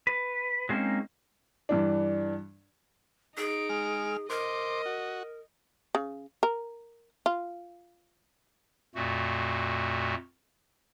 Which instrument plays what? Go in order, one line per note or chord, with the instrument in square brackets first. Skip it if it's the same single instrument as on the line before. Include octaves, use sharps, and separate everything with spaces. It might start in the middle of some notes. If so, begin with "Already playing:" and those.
[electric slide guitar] B4
F#3 G#3 A#3 C4 C#4 D#4
[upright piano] G2 E3 D4
[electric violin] D#4 D7 [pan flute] G#4
[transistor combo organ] G#3 F6
[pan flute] A#4 [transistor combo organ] C5 D6 [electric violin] D#5
[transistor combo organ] F#4
[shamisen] C#3
A#4
F4
[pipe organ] F2 A#2 A3 F#4